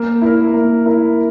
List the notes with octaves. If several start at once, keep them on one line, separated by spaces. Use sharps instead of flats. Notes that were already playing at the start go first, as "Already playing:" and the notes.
Already playing: A#3
E4 A#4
A#3
E4 A#4